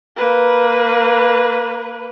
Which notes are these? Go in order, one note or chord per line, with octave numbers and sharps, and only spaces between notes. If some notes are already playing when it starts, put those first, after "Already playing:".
A#3 B4